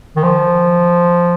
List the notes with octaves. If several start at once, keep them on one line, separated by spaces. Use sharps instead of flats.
D#3
F3